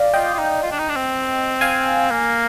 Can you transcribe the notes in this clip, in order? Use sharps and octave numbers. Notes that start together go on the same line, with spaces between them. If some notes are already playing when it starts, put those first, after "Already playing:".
Already playing: D5 F5
F4 D#5 G5
F4
D#4
F4
D4
D#4
D4
C4
F5 G#5
A#3